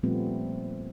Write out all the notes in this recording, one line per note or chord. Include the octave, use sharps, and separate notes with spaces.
A#2 F3 G3 A3 B3 C4